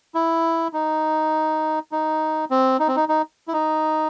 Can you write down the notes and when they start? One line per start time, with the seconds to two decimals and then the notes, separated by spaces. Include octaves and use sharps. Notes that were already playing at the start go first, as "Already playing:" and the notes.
0.15 E4
0.73 D#4
1.92 D#4
2.51 C4
2.80 D#4
2.88 C4
2.96 D#4
3.09 D#4
3.48 E4
3.53 D#4